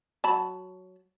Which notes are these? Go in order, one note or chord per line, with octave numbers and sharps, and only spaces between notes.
F#3 A5 B5